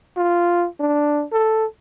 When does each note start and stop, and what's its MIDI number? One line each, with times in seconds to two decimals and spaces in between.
0.17 0.66 65
0.80 1.24 62
1.32 1.65 69